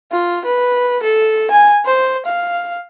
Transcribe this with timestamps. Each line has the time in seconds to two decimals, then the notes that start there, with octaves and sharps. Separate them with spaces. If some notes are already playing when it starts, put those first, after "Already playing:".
0.11 F4
0.45 B4
1.03 A4
1.51 G#5
1.85 C5
2.26 F5